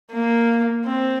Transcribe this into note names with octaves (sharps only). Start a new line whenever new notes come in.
A#3
C4